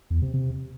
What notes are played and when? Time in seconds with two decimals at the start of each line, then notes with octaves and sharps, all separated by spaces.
0.10 E2
0.22 C3
0.34 C3